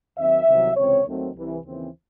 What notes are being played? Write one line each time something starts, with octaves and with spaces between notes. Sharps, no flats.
D#2 D#3 F#3 C4 E5
C2 C3 D#3 F#3 C4
C#2 C3 E3 C4 C#5
D#2 D#3 F#3 A3 C4
C2 C3 E3
D#2 C#3 E3 C4